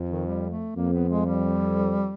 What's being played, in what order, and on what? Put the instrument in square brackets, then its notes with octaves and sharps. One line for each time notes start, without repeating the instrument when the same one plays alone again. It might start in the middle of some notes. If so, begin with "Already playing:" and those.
Already playing: [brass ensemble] F2
[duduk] D#3
G3
A3
[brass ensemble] F2 [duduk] A#3
[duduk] B3
G#3
G3